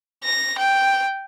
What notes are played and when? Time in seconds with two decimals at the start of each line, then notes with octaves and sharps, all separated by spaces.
0.24 A#6
0.58 G5